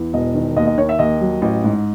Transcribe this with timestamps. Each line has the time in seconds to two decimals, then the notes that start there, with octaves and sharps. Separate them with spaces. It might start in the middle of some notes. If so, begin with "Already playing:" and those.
Already playing: E2
0.13 E1 D#5
0.35 D#3
0.56 D#2 D#5
0.67 D#5
0.78 D#3 C#5
0.89 E5
0.99 D#2 D#5
1.21 F#3
1.42 A1
1.64 G#2